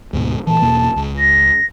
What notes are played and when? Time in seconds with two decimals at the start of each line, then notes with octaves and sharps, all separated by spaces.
0.13 D2 G#2 B2
0.47 A#2 E3 A5
0.62 E2 B2 A#3
0.96 C#2
1.19 A#6